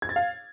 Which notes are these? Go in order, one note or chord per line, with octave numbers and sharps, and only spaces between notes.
G#6
A6
F5